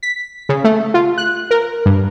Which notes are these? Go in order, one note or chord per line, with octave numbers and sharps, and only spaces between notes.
B6
C#3
A3
F4
F#6
A#4
G2